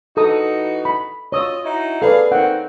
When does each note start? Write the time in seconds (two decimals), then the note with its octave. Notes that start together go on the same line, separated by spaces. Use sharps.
0.17 E3 D#4 F#4 A4 A#5 D#6
0.85 B5
1.32 F4 C#5 D#5 D#6 E6
1.65 D#4 E4 F#4
2.02 G#4 A4 B4 D5 F5
2.32 D#3 A#3 C4 F#5